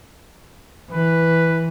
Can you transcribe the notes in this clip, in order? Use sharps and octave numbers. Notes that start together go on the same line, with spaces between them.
E3 B4